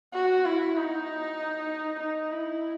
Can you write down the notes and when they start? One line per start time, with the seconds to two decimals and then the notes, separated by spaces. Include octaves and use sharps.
0.14 F#4
0.45 E4
0.77 D#4
2.00 D#4
2.32 E4